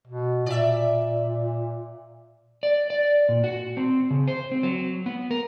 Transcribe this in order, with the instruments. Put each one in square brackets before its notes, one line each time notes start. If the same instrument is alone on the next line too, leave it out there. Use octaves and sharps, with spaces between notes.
[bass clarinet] B2
[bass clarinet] A#2 [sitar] D5 E5
[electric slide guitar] D5
D5
A#2
F#4
C4
C#3
C5
C4
F#3
B3
A#4